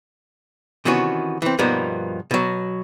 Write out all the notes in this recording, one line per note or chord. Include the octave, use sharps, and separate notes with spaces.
C3 D#3 E3 B3 C#4 F#4
E3 C4
G2 B2 F3 A#3 B3 D#4
B2 F#3